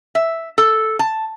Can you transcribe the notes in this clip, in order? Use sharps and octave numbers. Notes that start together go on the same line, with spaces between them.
E5
A4
A5